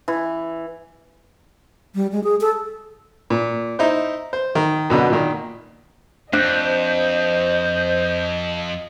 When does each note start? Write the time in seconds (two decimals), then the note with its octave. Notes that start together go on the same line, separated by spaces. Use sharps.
0.08 E3
1.95 G3
2.12 G#3
2.24 G#4
2.41 A4
3.30 A#2
3.79 D#4 E4 C5
4.33 C5
4.55 D#3
4.90 F#2 B2 D3
5.10 A#2 D#3
6.33 F2 D4 C5 D#5